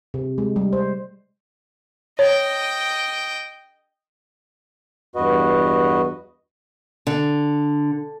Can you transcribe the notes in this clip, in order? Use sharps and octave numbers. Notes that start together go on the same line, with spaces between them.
C3
G#3
G3
C5
C#5 D#5 G5
E2 G2 F#4 B4 D#5
D3